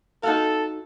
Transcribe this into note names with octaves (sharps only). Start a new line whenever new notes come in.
D#4 F#4 A4 F5